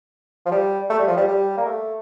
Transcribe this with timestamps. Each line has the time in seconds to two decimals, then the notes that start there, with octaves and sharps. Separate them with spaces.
0.46 F3
0.51 G3
0.90 A3
0.99 G3
1.08 F3
1.17 G3
1.28 G3
1.57 A#3
1.66 A3